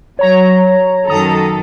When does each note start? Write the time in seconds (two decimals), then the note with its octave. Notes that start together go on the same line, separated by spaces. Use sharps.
0.19 F#3 C#5 A#5
1.07 F#2 D#3 A4 A#5 D#6